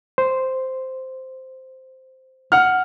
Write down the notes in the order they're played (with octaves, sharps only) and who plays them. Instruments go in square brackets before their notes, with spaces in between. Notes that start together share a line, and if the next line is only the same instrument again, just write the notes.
[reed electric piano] C5
[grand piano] F#5 F6